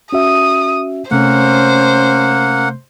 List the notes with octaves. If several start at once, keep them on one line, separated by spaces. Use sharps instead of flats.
C#4 F#4 E5 D#6
C3 A3 A#3 C#4 C5 F#5